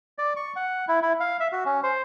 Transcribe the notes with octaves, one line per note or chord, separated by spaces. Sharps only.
D5
C#6
F#5
E4
E4
F5
E5
F#4
C#4
C5